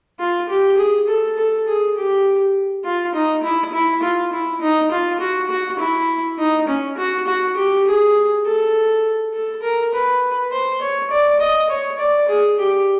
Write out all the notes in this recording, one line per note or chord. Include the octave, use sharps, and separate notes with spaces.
F4
G4
G#4
A4
A4
G#4
G4
F4
D#4
E4
E4
F4
E4
D#4
F4
F#4
F#4
E4
D#4
C#4
F#4
F#4
G4
G#4
A4
A4
A#4
B4
C5
C#5
D5
D#5
C#5
D5
G#4
G4